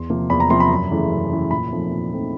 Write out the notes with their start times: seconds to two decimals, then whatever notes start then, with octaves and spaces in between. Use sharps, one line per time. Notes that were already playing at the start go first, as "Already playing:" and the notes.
Already playing: E2 C6
0.10 C3 F3 A#3
0.30 E2 B5
0.40 A#5
0.50 C3 F3 A#3 C6
0.60 B5
0.70 F#2
0.91 C#3 E3 A3
1.10 F#2
1.31 C#3 E3 A3
1.51 A#2 B5
1.71 F3 A3 C4 D#4
1.91 A#2
2.12 F3 A3 C4 D#4